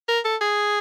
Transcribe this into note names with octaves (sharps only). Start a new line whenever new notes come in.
A#4
A4
G#4